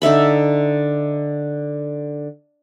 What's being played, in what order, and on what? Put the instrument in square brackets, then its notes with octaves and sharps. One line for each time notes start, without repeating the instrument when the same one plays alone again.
[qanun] D3 D#4 E5 B5